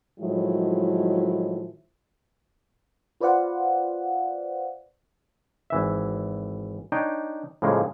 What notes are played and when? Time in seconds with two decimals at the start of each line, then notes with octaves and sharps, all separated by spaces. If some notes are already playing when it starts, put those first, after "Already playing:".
0.20 A2 D#3 F3 F#3 G#3 E4
3.21 F4 B4 C5 D5 F5 F#5
5.70 G#1 E3 E5
6.92 D4 D#4 C#5 G5
7.62 A2 C#3 F3 G#3 A#3